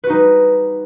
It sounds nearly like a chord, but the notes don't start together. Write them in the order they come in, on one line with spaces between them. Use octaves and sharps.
B4 F#4 D#4 G3